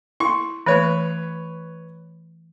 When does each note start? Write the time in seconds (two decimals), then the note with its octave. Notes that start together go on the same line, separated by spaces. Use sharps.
0.20 E4 C#6
0.66 E3 A3 B4 C#5